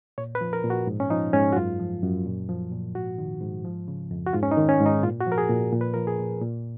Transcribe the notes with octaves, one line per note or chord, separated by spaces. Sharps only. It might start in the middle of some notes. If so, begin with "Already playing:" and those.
A#2 C#5
B4
F3
A#4
A#2
F#4
G#2
C#4
F3 D#4
G#2 C#4
F#4
F#2 F4
F3
F#2
A#2
F3
A#2
G#2 F#4
D#3
G#2
F3
C#3
F2
F#4
G#2 F4
C#4
D#4
D#3
C#4
G#2
D#4
A#2 F4
F#4
F3
A#4
G#4
A#2
A#2
B4
F3 A#4
G#4
A#2
A#2